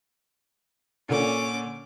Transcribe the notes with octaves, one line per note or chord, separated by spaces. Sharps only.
A#2 D3 C#4 D6